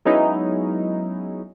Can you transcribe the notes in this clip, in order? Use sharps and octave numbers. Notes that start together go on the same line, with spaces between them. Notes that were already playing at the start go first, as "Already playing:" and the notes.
F#3 G#3 B3 C#4 D#4 E4